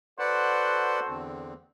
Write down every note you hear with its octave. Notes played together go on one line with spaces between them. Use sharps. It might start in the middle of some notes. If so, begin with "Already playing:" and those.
F#4 A4 B4 C5 D5 F#5
E2 D3 C4